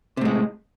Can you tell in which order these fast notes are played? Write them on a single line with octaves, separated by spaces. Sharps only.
C3 A2 G#3